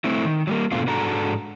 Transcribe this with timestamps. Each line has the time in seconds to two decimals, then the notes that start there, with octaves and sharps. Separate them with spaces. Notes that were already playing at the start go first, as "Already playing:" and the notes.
0.04 A3 C4 E4
0.25 D#3
0.47 F#3 G3 A#3
0.72 G#2 B2 D3 A3 C4 F4
0.87 G#2 G#3 D4 F#4 A4 A#5